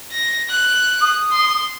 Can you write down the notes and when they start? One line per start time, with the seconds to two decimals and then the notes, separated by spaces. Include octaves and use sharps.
0.12 A#6
0.50 F#6
1.01 D#6
1.33 C6